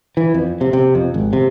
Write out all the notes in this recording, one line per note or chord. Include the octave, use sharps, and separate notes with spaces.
E3
F2
C3
C3
F2
G#1
C3